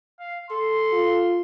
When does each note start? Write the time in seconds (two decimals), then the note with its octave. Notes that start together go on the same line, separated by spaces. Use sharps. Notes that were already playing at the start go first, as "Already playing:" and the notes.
0.20 F5
0.51 A4 C6
0.93 F4